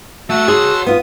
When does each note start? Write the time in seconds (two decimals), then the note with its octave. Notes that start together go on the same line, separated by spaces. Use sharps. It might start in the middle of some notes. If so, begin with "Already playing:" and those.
0.30 A3 F#4 A5 E6
0.48 G#4 C#5 C6
0.86 B3 F4 D#6